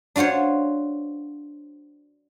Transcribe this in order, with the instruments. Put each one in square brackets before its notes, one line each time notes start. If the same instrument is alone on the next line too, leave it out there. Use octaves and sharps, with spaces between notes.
[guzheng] D4 F4 F#4 C5 C#5